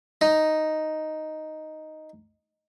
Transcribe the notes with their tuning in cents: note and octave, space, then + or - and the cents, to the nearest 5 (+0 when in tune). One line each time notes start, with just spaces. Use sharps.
D#4 +0